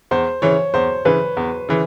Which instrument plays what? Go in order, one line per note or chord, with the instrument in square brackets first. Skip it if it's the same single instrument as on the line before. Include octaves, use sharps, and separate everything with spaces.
[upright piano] E2 [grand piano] C5
[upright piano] C#3 E3 [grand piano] C#5
[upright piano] E2 [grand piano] C5
[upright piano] C#3 E3 [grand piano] B4
[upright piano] E2
C#3 E3